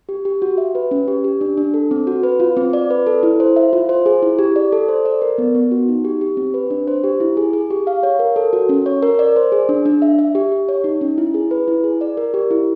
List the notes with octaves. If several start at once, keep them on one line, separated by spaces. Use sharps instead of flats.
G4
G4
F#4
E5
B4
C#4
G4
G4
D4
D4
A4
C4
F#4
B4
F4
C4
D5
B4
A4
E4
C5
E5
F4
C5
G#4
E4
G4
D5
A4
C5
D5
A#4
B3
B3
F#4
D#4
G4
G4
C4
B4
D4
C5
G4
E4
G#4
G#4
G4
F5
C#5
A#4
A4
F#4
C#4
C#5
A#4
D5
C5
G#4
D4
D4
E5
E5
G4
G4
C#5
D#4
C#4
E4
G#4
B4
E4
G#4
D5
A#4
G4
E4